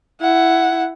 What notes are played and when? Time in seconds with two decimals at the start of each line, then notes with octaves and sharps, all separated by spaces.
0.21 E4 F#5